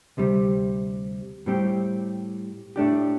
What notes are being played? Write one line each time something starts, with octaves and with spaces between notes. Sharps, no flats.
D2 C3 G3
A2 G3 C4 G4
A2 A3 D4 G4